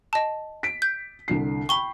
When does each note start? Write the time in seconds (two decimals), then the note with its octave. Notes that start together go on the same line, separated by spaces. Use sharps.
0.13 D#5 A5
0.63 B6 D7
0.82 G6
1.28 C2 D3 C7
1.69 G5 B5 C#6 G7